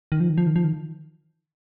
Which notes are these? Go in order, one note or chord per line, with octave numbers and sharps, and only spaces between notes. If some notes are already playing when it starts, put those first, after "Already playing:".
D#3
F3
D#3
F3
D#3
F3
D#3